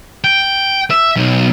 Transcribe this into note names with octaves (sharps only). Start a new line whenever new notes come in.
G5
E5
B1